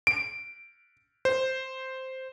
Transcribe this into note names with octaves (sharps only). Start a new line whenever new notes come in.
D7
C5